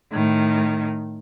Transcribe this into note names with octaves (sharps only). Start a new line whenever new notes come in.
A2 D#3